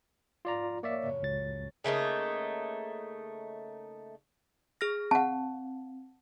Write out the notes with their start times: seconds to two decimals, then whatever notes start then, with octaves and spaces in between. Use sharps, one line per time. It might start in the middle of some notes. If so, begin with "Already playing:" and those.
0.45 F1 G#2 G3 F4 D5 A#5
0.83 A#3 C#5 D5 E5
1.02 F#2 A2 C#3
1.22 C#2 A6
1.84 C#3 A3 A#3 D#4
4.81 G#4 F6 A#6
5.11 C4 F#5 A5